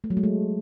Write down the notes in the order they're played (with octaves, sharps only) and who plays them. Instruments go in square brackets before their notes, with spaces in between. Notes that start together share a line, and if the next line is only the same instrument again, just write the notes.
[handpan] A3
F#3
G#3
A3